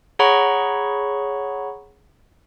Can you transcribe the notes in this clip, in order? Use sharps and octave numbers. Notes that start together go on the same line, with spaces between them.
G#4 C#5 F#5 A#5 B5 C#6